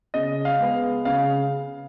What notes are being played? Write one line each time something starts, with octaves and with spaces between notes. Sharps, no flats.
C#3 D#5
F5
G#3 B3
C#3 F5